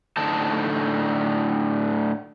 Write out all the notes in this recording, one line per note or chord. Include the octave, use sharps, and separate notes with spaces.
A2 D3 D#4 C5 A5